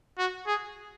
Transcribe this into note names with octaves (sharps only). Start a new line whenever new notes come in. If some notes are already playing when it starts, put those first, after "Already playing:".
F#4
G#4